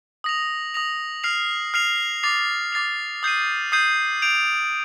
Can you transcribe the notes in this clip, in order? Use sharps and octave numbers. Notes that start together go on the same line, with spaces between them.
D#6 A#6 F7
D#6 A#6 F7
F6 C7 F7
F6 C7 F7
D6 A6 C7 F7
D6 A6 C7 F7
D#6 G6 C7 D#7
D#6 G6 C7 D#7
G6 D7 F7